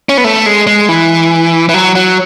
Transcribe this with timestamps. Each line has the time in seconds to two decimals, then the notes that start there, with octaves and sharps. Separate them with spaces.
0.09 C#4
0.17 B3
0.24 A3
0.46 G#3
0.67 G#3
0.89 E3
1.69 E3
1.74 F#3
1.95 F#3